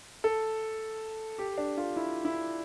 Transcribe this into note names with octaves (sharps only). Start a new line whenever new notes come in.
A4
G4
D4
F4
E4
E4